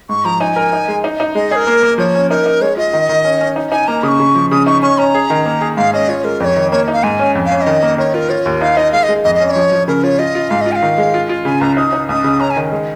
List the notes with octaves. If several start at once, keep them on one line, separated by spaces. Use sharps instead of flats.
G#2 C#6
F3 A#5
D#4 G#5
A#4
D#4
G#3
D#4
D#4
G#3 D#5
G#4 A#4 C#5
A#3
A#3
F3 C#5
C#4
D#4 A#4
D#4
G#3 C#5
F4 D#5
D#3
D#3
C#4
C#4
D#4
D#4 G#5
A#3 A#5
C#3 C#6 D#6
C#3
F3
C#3 D#6
D#4 C#6
C#4 C#6
C#4 A#5
G#4
D#3
A#3
G#4
G#2 F5
C#4 D#5
F4 C#5
G#3 A#4
F2 C#5 D#5
D#3
A#3 C#5
D#4
F5
G#2 G#5
C#4
F2
F5
C#4
F5
D#5
D#3
A#3
D#3 C#5
F4 A#4
F4 C#5
D#2
D#4 F5
D#4 D#5
G#3 F5
D#5
G#3
F2 D#5
D#5
C#4
D#5
C#5
F3
F3
C#3 A#4
F4 C#5
F4 D#5
F4
G#2 F5
D#5
F4
G#5
F5
D#3
G#3
F4
F4
C#3 G#5
C#2 A#5
D#4 D#6
D#4
C#2 D#6
C#3
C#4 A#5
G#5
D#3
G#3